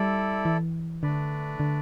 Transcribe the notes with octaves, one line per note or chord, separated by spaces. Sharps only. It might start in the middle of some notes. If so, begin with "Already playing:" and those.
Already playing: G3 E4 A4 D5
E3
D3 A3 D4 B4 D5
D3